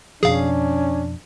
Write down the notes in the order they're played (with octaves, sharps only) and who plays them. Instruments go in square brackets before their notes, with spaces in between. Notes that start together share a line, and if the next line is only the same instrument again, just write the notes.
[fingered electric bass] F2 B2 F3 [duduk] C#4 [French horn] D4 [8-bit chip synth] G#4 F5